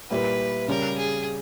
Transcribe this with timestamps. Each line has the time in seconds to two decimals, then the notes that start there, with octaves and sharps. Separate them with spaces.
0.10 A#2 G3 A#3 E4 G4 B4
0.68 C#3 G3 C#4 A#4
0.98 G#4